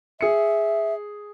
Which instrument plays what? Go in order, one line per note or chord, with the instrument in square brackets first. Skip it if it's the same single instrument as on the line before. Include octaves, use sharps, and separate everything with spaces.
[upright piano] G#4 C#7 [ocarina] E5